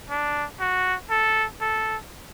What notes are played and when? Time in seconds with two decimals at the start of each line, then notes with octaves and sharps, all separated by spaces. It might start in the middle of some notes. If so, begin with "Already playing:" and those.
0.10 D4
0.60 F#4
1.10 A4
1.61 A4